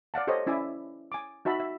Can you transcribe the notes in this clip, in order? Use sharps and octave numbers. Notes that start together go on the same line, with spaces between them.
D5 F5 F#5 A5
G4 A4 C5 C#5 D#5
C#4 E4 D5 E5 G#5
G#5 D6
D#4 F#4 E5 A5 B5
E5